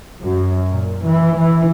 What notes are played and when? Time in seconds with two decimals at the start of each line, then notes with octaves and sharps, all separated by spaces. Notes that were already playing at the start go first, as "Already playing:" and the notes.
0.23 F#2
0.72 A#2
1.07 E3
1.38 E3